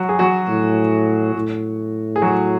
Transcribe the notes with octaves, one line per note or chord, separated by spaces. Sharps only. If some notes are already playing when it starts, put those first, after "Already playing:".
Already playing: F#3 F#4
G#4
F#3 F#4
A2
A2
G#4
F#3 F#4